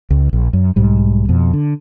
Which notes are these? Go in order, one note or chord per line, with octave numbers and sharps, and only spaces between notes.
C#2
A#1
F#2
B1 G#2 G3
F2 B2
D3